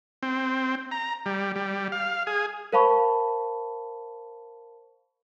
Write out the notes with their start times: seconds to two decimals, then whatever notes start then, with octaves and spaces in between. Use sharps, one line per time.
0.23 C4
0.91 A#5
1.26 G3
1.56 G3
1.92 F5
2.27 G#4
2.73 A#4 C5 F5 A5 B5 C#6